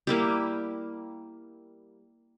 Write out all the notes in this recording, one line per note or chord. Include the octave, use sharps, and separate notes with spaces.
G3 A#3 E4 G4